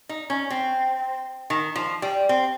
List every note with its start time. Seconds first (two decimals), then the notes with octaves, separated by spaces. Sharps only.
0.09 D#4
0.30 C#4
0.50 C4
1.50 D#3
1.76 F3
2.02 G3
2.29 C4